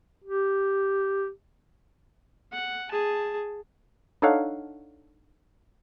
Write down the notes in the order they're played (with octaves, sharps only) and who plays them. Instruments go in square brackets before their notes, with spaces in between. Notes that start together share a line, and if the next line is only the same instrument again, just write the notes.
[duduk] G4
[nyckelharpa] F#5
G#4 A5
[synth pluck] D4 D#4 A4 C#5 F5 F#5